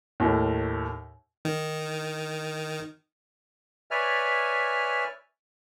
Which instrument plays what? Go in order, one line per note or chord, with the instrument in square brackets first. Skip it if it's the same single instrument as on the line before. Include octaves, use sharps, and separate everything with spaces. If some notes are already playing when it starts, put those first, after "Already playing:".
[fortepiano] D#2 A2
[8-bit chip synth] D#3
[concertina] B4 C#5 D5 E5 G#5 F6